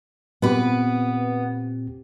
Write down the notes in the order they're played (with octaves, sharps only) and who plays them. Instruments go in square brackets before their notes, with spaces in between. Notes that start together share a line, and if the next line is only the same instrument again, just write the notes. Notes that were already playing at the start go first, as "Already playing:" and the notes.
[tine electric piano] A#2 C4 G4 [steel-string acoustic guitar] B3 B4